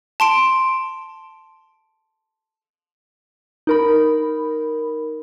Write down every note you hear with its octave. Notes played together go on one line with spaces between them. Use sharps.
A5 C6 D7
D#4 A#4 B5